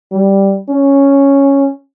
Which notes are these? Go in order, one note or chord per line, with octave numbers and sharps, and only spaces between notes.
G3
C#4